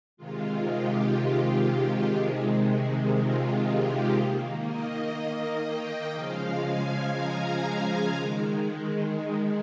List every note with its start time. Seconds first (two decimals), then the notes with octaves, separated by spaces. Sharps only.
0.17 C3 D#3 G#3 F4
0.67 G4
1.16 G4
2.16 C3 D#3 G#3
3.15 F4
3.65 G4
4.15 D#3 A#3
4.64 D#5
5.63 G5
6.13 C#3 F3 G#3 F5
6.63 G#5
7.12 A#5
7.62 G#5
8.12 D#3 G#3